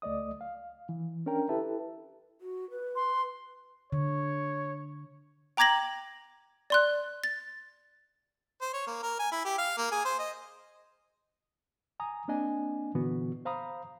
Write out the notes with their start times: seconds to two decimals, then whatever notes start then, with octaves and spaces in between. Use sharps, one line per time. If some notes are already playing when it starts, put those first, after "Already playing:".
0.02 C#2 A3 D5 D#5 D#6
0.41 F5
0.89 E3
1.26 C#4 D4 A#4 G5 A#5
1.49 E4 G4 A4 B4 E5 A5
2.41 F#4
2.70 B4
2.96 C6
3.92 D3 C#5
5.57 G5 A#5 D6 G#6 A#6 F#7
6.70 D5 C6 F#6
7.24 A6
8.61 C5
8.74 C#5
8.87 A#3
9.03 A#4
9.19 G#5
9.32 E4
9.45 G4
9.58 F5
9.77 A#3
9.91 G#4
10.05 C5
10.19 D#5
12.00 G#5 A#5 D#6
12.28 A#3 C4 D4 D#5 G#5
12.95 A#2 D3 E3 B3 F#4
13.45 C5 F5 A#5 B5 D#6